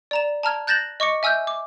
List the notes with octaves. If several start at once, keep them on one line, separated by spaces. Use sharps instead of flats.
D5 A#5 E7
A5 A#5 F6 G#6
F#6 G6 A6 A#6 E7 F#7
D#5 C#6 D6 C#7
E5 G#5 E6 F6 G6
D6